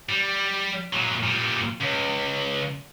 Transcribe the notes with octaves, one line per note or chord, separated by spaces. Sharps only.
G3
A#2 F#3
A#2 G3
C#2